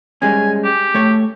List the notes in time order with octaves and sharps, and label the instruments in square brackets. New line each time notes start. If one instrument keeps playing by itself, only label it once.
[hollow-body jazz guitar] G3 G#3 C#4 [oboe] G#5
[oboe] G4
[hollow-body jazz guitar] A3 C#5